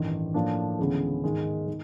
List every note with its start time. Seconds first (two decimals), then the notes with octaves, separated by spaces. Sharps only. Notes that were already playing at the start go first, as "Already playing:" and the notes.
Already playing: A1 G2 D#3
0.34 A2 F3 A#3 D4
0.79 D2 C#3 E3 G#3 B3
1.24 G#2 D#3 G#3
1.67 D#3